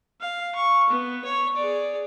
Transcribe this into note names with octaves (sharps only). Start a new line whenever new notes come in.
F5
C#6
B3
C#5
G#4 D5